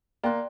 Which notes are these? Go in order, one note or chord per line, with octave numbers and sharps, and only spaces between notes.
A#3 D5 G5 C6 F#6